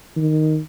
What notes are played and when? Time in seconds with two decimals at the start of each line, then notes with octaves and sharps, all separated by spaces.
0.16 D#3